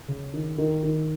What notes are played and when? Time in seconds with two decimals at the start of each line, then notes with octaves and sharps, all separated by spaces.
0.08 C#3
0.33 D#3
0.58 D#3
0.83 D#3